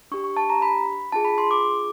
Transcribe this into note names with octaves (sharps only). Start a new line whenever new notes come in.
D4 G4 C#6
C#6
A5
A#5
B5
D4 F4 G#4 A5
B5
C6
D6